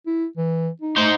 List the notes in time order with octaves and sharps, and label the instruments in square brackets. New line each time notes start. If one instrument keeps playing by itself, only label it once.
[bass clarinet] E4
E3
D#4
[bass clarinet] A3 [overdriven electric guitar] D#4 C5